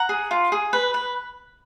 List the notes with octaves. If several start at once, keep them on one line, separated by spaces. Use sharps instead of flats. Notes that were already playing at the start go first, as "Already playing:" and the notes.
Already playing: F#5 A#5
G#4
F4
G#4
B4
B4